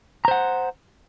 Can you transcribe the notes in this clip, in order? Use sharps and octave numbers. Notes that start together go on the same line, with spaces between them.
C5 F#5 A#5